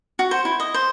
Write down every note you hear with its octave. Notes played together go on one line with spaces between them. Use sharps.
F#4
C5
E4
D#5
C5